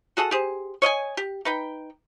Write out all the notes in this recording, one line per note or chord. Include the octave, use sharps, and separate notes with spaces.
F#4 G#4 A4 F#5
G4 G#4 C5
C#5 D#5 F5 G#5
G4
D#4 B4 G5